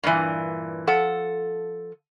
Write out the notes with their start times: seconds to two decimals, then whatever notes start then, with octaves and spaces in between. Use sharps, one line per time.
0.03 G2 A#2 E3
0.87 F3 A4 F#5